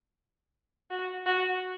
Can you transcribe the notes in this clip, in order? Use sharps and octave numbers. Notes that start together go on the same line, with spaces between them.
F#4
F#4